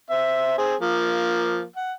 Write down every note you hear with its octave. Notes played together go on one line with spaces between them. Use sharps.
C4 E5
C4 G#4
F3 A#3
F#5